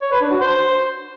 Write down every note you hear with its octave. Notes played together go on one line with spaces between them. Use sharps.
C#5
B4
D4
F#4
C5